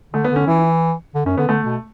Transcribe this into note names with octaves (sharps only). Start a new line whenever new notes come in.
D3 A3
B3
D3
C#4
E3 E4
E4
D3
F#2 C#4
D3 B3
D3 A3
B2